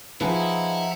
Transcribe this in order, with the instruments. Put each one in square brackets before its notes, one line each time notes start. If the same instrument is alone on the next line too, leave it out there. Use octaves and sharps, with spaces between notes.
[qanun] F3 [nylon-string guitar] D#4 G#4 B4 [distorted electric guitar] E4 [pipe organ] E5 F#5 A#5